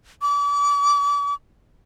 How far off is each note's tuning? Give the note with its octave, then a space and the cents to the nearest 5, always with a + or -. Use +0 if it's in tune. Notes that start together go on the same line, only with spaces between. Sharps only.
D6 -35